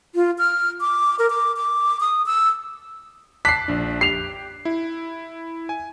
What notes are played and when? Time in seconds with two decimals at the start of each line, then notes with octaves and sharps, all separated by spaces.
0.15 F4
0.38 F6
0.81 D6
1.19 A#4
1.30 D6
1.57 D6
2.00 D#6
2.26 E6
3.45 A5 D6 F#6 B6 C7
3.68 A#1 D4
4.01 G4 C7 F7
4.65 E4
5.69 G#5